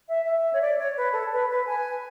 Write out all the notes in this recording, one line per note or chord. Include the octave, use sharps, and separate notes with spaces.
E5
E5
C#5
D5
C#5
B4
A4
B4
B4
G#5